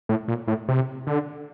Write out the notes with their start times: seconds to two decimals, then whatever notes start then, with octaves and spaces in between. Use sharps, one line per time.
0.09 A2
0.28 A#2
0.48 A2
0.69 C3
1.07 D3